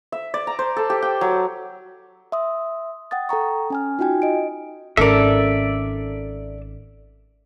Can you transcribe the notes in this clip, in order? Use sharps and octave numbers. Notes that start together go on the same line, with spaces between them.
E5
D5
A#5
C5
A4
G4
G5
F#3
E5 C6 D#6
F#5 G5 D#6 A6
A4 G5 A#5 C#6
C#4 G#5 F6
D#4 F4 F#4 G5 G#5
D#5 D7
G#1 C#4 A4 A#4 D5 E5